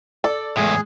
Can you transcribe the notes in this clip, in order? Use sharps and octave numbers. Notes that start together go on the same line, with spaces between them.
A4 D5
E2 A2 G#3 G#4